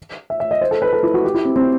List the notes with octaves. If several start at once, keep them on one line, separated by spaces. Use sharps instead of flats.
E5
E5
D#5
C5
A4
B4
A4
E4
F#4
G4
E4
C4
C4